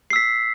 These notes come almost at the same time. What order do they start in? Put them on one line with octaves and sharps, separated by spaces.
C7 E6 B6